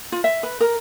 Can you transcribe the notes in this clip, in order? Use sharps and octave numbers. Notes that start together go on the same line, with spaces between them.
F4
E5
B4
A#4